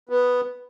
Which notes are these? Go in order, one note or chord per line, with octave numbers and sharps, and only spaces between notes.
B3